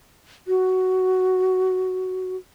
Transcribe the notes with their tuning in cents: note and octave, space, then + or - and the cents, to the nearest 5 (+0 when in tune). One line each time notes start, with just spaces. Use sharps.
F#4 +10